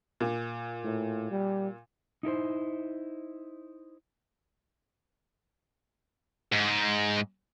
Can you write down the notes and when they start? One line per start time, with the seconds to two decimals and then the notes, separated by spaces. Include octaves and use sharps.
0.20 A#2
0.84 A2
1.31 G3
2.23 D#4 E4 A#4 C5
6.52 G#2